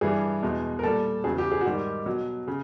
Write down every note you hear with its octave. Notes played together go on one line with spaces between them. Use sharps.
G2 E3 G3 G#4
E2 B2 G#3
A#4
A#2 G3 A4
E2 C#3 F#3 G#4
G4
G#4
F#4
G#2 D#3 G3 G4
B2 F#3
C#3